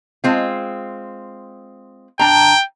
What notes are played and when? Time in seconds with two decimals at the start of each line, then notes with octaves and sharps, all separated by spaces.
0.24 G#3 C4 F4
2.19 D4 G5 A#5